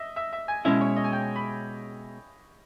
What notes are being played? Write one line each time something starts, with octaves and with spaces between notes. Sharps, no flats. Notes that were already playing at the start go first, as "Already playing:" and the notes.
Already playing: D#5 E5
E5
E5
G#5
B2 G#3 C#4 E4 E5
C#5
D#5
G#5
G5
B5